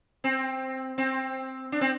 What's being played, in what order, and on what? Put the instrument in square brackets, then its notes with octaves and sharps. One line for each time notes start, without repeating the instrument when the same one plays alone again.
[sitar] C4
C4
D4
C4